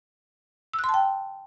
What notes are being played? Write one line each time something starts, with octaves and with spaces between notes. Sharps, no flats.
E6
F#6
C6
A5
G5